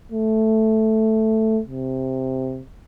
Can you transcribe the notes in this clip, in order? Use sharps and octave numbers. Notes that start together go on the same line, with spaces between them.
A3
C3